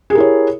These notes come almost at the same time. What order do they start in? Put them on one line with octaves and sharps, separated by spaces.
G#4 G4 A#4 E4 C#5